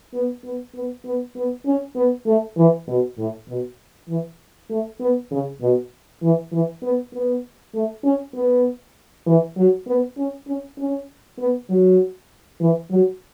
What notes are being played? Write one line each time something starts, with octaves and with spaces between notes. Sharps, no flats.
B3
B3
B3
B3
B3
C#4
B3
A3
E3
B2
A2
B2
E3
A3
B3
C#3
B2
E3
E3
B3
B3
A3
C#4
B3
E3
F#3
B3
C#4
C#4
C#4
B3
F#3
E3
F#3